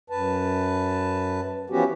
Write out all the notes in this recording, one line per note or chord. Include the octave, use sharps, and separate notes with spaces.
F#2 B4 A5
E3 F3 B3 C#4 F#4 G4